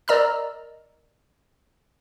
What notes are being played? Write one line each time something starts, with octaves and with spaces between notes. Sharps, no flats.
A#4 D5 D#5 A#5 E6 F6